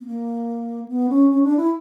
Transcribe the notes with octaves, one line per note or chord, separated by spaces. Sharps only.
B3
A#3
B3
C#4
C#4
D4
E4